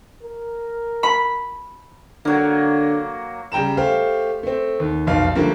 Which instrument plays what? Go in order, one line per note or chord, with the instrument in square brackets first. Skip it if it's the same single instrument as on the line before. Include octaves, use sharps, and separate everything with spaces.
[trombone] A#4
[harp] B5
[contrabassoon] D3 [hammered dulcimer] F#3 A#3
[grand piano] C#3 G3 G5 A#5 E7
A3 G4 C5 F5
A3 C4
D#2
F1 B1 F5
D3 F3 G3 A3 A#3